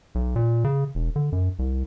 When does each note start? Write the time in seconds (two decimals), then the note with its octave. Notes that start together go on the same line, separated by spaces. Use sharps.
0.15 B1
0.36 A#2
0.64 C#3
0.95 E1
1.16 D3
1.32 F#2
1.59 C2